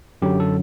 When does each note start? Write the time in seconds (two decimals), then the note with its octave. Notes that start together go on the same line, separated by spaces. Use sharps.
0.22 F#2 D3 F#3 G4
0.40 A4